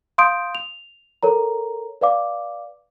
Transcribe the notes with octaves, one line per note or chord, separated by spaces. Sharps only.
F5 C6 D#6 G6 D7
F7
A4 A#4 C#5 A#5
B4 D5 F5 D6